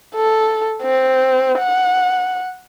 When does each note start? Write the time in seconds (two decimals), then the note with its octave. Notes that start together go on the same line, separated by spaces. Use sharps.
0.15 A4
0.82 C4
1.58 F#5